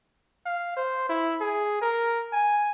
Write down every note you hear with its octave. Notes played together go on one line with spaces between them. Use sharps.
F5
C5
E4
G#4
A#4
G#5